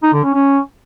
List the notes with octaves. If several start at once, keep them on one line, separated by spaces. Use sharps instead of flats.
D#4
D3
C#4
C#4